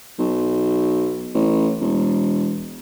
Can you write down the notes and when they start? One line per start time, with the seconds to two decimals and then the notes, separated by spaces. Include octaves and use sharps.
0.19 B1
1.34 A1
1.80 E1